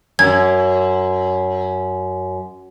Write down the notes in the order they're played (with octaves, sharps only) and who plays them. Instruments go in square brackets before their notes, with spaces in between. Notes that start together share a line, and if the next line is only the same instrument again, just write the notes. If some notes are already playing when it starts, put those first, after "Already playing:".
[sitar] F#2 [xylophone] G#6